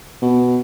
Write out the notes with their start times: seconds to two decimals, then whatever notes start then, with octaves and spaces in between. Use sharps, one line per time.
0.22 B2